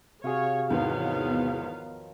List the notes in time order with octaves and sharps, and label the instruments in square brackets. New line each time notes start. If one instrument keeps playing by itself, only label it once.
[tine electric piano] C3 F#4 G#4 [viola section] C#5 [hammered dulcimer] F5
[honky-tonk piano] E2 G#2 [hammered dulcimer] D#3 F3 F#3 [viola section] B3 F5